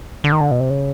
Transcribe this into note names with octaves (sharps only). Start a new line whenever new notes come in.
D3
D#3
D3
B2
C3
C#3